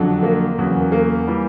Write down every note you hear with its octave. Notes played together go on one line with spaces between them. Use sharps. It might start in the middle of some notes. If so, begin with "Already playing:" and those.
Already playing: F2 D3 F#3
A#3
E2 C#3 F#3
A#3
E3 G3